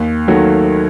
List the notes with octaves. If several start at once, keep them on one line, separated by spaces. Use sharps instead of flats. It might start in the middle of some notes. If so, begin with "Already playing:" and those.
Already playing: D#2
D#3 F#3 A3